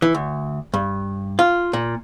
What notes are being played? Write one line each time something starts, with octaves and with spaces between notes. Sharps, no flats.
E3
D2
G2
F4
A#2